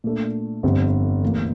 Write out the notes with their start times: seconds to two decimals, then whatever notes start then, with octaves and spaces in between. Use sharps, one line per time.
0.04 A#2 A3 D4
0.63 G1 F2 D3 G3 C4
1.23 D2 C3 E3 A#3